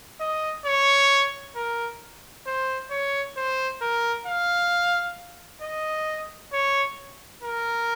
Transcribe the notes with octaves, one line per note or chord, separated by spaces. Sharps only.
D#5
C#5
A#4
C5
C#5
C5
A#4
F5
D#5
C#5
A#4